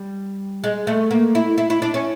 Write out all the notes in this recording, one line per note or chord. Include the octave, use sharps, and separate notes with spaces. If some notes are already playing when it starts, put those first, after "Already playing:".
Already playing: G3
G#3
A3
A#3
E4
E4
E4
D4
C#4